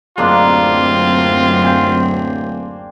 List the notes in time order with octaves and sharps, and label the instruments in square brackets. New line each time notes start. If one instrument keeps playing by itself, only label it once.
[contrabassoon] D1 [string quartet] F#2 C4 [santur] G#3 A#3 D4 [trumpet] F4
[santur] G5 G#5 C6